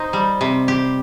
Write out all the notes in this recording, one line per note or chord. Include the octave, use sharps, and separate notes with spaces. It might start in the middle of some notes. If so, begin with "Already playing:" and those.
Already playing: D#4 C5
G3
C3
G4